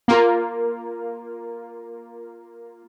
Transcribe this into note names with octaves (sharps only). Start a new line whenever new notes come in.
A#3 F4